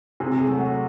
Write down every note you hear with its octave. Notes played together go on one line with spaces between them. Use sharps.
C3 G#4
G#4
F#3 A3
F#4